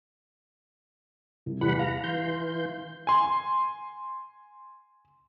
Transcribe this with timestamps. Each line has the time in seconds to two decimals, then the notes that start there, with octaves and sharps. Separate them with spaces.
1.46 C2
1.61 E2 G3 F#5 B5
1.79 F5 A#5
2.04 E3 C6 G6
3.07 G#5 C6